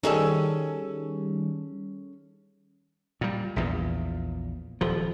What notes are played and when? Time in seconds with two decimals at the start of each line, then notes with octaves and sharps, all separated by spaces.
0.03 D#3 G3 C#4 G#4 A4
3.21 A#2 G3
3.56 A#1 E2 A#2
4.81 D#1 F3